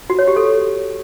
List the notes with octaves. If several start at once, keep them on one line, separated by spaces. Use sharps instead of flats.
F#4
C#5
G4
A4